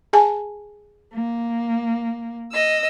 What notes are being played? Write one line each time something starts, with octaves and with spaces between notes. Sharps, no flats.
G#4 G#5 A5
A#3
D#5 E6